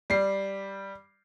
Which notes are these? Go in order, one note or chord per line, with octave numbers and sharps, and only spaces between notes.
G3 C7